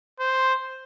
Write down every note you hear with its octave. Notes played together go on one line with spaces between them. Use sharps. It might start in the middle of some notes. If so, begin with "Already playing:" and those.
C5